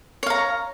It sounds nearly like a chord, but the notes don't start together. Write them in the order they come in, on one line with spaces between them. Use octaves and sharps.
C#5 F5 A#5